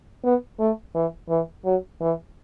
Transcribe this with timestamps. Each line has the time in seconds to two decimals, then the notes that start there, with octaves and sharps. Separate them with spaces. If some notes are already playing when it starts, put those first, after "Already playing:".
0.24 B3
0.60 A3
0.95 E3
1.30 E3
1.65 F#3
2.01 E3